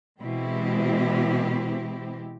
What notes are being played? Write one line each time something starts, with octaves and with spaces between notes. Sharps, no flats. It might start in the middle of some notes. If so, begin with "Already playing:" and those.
B2 E3 G#3 C4 E4 G4